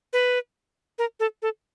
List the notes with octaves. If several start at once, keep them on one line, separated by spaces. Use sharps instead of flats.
B4
A#4
A4
A4